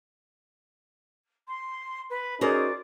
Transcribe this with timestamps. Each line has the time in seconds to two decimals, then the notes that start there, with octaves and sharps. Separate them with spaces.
1.47 C6
2.10 B4
2.41 C#4 D#4 F#4 G#4 A#4 C5 D5